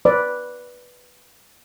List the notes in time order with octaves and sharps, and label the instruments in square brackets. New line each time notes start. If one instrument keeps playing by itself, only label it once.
[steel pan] B4 D5